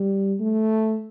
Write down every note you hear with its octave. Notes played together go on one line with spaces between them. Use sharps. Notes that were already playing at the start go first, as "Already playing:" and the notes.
Already playing: G3
A3